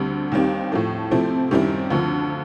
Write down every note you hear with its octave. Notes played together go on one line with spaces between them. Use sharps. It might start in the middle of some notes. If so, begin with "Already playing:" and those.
Already playing: D2 D3 G3 C4
D#2 D#3 G3 C4 D#4
A2 F3 A3
C3 F3 A3 C4 E4
F#2 D#3 G3 C4 E4
D2 D3 F3